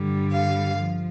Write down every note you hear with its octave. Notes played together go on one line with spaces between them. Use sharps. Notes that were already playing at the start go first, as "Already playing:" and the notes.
Already playing: G2 D3 G3
F5
F3